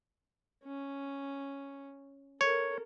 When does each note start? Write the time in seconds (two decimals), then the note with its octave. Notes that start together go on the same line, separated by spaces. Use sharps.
0.64 C#4
2.41 A4 A#4 C#5